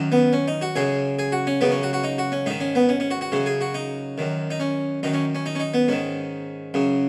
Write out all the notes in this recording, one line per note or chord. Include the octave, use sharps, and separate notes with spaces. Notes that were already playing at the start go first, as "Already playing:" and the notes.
Already playing: F#2 D#3
B3
C#4
D#4
F#4
F#2 C#3 G#4
G#4
F#4
C#4
F#2 C#3 B3
C#4
F#4
F#4
D#4
F#4
C#4
G#2 D#3 D#4
C#4
B3
C#4
C#4
F#4
F#4
F#2 C#3 C#4
G#4
F#4
D#4
F#2 D#3
D#4
C#4
F#2 D#3 D#4
C#4
C#4
D#4
C#4
D#4
B3
G#2 D#3 C#4
F#2 C#3